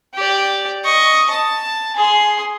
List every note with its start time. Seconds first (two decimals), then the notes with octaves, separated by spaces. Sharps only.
0.14 G4 D5
0.84 D#5 C#6
1.31 A5
1.95 G#4 C6